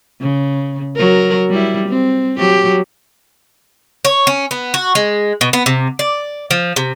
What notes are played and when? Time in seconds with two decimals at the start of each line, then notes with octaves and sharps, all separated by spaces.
0.21 C#3
0.96 F#3 A#4
1.50 G3 E4
1.88 C4
2.38 F#3 G4
4.05 C#5
4.27 C#4
4.51 B3
4.74 F#4
4.95 G#3
5.41 B2
5.53 B3
5.66 C3
5.99 D5
6.51 F3
6.76 C3